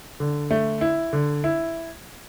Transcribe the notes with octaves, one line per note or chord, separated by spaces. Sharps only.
D3
A3
E4
D3
E4